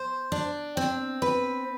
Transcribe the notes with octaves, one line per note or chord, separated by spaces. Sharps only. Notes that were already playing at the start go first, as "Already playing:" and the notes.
Already playing: C5
D4
C4
B4